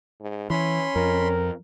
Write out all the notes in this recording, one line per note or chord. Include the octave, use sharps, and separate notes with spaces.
G#2
E3 C#4 B5 C6
F2 A#4